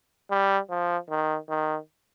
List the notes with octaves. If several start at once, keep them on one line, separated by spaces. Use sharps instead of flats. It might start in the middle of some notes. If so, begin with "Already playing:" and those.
G3
F3
D#3
D#3